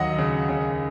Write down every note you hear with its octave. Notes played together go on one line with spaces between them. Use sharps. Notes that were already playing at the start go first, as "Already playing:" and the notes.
Already playing: D#2 F#3 D#5 F#5
C#3
C#3